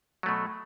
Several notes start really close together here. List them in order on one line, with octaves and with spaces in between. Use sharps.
F#3 A3 B2